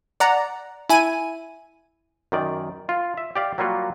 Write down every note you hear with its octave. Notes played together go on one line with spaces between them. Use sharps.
D5 F#5 A#5
E4 G#5 D#7
F#2 D#3 D5
F4
E5
G4 D5 F5
F#3 G3 A#3 F4 F#4